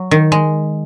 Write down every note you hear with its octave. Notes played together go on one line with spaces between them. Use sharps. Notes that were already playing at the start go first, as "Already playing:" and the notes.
Already playing: F#3
D#3
G#3